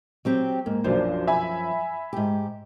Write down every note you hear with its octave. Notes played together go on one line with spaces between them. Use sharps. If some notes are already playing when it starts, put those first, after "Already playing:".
F#3 C4 G4
G#2 A#3
B1 F#2 F3 D4 C5
E5 G#5 B5
G#2 G4